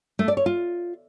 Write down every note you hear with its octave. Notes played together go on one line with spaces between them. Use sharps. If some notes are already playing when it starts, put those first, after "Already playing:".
A3
D5
C#5
F4